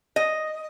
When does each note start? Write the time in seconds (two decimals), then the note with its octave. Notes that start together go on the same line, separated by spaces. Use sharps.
0.16 D#5